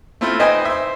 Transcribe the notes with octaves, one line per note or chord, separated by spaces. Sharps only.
A3 C4 E4 F4
D#4 B4 C5 D#5 G5 G#5
C5 E5